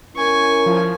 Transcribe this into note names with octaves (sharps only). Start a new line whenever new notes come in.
C#4 E4 A#4 G#5 C#6
F3